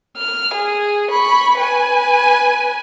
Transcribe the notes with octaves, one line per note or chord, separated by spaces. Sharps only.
F6
G#4
B5 C#6
B4 G#5